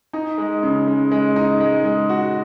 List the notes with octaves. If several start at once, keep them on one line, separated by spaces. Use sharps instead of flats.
D#4
G#3
C#3
G#3
G#3
D#4
G#3
G#3
F#4